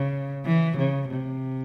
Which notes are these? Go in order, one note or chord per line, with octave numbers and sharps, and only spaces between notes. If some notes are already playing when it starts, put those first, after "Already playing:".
Already playing: C#3
E3
C#3
C3